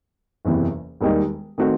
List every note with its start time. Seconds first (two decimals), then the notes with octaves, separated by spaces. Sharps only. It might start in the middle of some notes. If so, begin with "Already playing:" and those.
0.45 F#1 E2 C3 E3
1.01 E1 D#2 D#3 G3 D#4
1.58 D#3 A3 C4 F#4